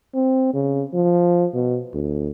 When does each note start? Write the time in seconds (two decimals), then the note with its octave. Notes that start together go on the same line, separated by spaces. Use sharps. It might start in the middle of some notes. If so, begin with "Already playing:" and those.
0.14 C4
0.54 C#3
0.94 F3
1.54 B2
1.93 D2